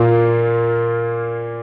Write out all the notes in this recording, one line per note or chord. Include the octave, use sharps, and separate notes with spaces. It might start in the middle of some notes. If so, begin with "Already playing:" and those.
Already playing: A#2 A#3 F4